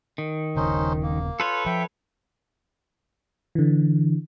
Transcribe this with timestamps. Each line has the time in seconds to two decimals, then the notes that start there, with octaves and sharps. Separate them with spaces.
0.18 D#3
0.56 D#1 C#3 C#4 D#4 C5
1.03 A#3
1.40 F4 A4 B4 C#5
1.66 F3 E5 G5
3.55 D3 E3